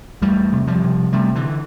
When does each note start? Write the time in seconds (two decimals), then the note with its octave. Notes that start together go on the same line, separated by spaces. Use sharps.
0.21 E2 G3 A3
0.52 C3
0.67 F3 G3
0.83 C3
1.13 C3 G3 A3
1.35 D3 E3